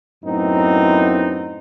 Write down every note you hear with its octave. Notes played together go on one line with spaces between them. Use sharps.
F#2 A2 B3 C4 D#4